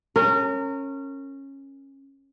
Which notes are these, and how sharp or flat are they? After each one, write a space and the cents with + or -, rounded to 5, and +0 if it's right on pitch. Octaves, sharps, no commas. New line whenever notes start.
C#4 -15 A#4 -30